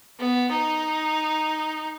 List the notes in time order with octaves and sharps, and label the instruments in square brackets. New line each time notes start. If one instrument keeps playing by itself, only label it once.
[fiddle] B3
D#4